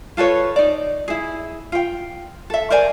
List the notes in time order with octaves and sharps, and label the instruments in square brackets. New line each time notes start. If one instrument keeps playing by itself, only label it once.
[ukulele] F4 A4 B4 C#5
D#4 D5
E4 G#4
F4 G5
A4 E5
A#4 C5 D5 G#5